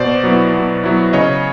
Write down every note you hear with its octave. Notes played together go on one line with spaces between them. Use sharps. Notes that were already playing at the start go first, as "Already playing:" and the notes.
Already playing: B2 C5 D5
F#3 B3 E4
B2
F#3 B3 E4
C#3 C#5 D#5